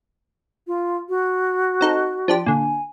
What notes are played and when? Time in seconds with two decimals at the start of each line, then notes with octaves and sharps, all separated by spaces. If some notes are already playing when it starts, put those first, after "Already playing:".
0.67 F4
1.09 F#4
1.81 C4 D#4 A4
2.28 F3 D4 G4
2.46 A#2 D3 G#5